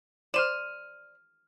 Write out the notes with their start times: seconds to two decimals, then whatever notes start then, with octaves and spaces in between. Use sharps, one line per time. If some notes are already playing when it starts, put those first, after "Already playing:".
0.34 C5 D5 F6 D#7 E7